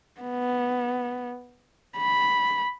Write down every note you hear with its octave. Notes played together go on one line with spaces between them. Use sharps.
B3
B5